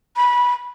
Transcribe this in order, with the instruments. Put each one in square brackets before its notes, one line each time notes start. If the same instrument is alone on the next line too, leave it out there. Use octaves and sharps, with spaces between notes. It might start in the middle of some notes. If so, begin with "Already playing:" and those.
[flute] B5